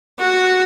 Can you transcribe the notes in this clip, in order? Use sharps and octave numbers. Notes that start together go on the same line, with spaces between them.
F#4